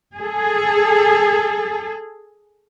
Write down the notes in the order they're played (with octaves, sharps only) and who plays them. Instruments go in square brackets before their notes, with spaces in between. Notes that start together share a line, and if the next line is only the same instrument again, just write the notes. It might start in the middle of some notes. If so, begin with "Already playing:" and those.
[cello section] G#4 A4